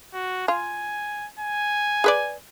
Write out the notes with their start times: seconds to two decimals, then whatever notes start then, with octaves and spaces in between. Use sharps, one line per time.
0.14 F#4
0.48 F4 G#5
1.39 G#5
2.04 G#4 B4 D5